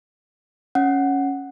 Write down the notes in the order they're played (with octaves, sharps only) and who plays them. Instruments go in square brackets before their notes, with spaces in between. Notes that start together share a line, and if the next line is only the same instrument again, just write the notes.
[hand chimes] C#4 F#5